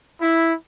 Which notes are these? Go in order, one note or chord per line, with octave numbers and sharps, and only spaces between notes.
E4